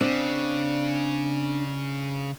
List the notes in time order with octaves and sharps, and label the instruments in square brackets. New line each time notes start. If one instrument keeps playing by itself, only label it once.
[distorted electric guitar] C#3 [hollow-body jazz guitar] C4 [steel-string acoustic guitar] D4